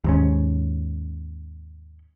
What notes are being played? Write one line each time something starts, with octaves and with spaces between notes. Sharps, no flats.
D#2 G#2 C#4